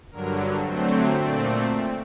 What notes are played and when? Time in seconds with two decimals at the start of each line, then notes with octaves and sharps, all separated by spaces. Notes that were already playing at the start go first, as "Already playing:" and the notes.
0.11 G2 D3 F#3 A#4
0.66 D3 F#3 A3 C4 C5
1.20 A#2 A3 C4 D5